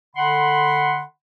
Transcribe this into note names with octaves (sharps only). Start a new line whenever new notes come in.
D3 F#5 B5 C6